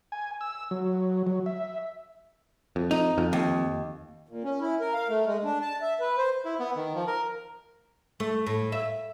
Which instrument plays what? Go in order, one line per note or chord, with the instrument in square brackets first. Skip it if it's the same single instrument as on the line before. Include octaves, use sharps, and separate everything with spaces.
[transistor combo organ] G#5
E6
F#3
F#3
E5
[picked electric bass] F2
[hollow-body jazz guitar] D#4
[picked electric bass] F2
[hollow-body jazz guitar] D#2
[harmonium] A#2
C#4
E4
A#4
F5
A3
G#3
D4
A5
E5
B4
C5
[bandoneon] E4
B3
D#3
F3
A#4
[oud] A3
A2
E5